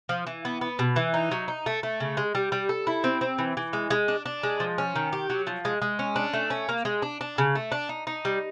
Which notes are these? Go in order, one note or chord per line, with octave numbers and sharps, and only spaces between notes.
F3
E3
B3
B3
B2
E3
D#4
F#3
D#4
A3
A3
C#3
G#3
G3
G3
A4
E4
C4
C4
E3
E3
G#3
G#3
D4
D4
G#3
F3
C#4
D#3
G4
F#3
F3
G#3
G#3
C#4
D4
A3
C#4
A#3
G#3
D4
D4
C#3
A3
D4
D#4
D#4
G3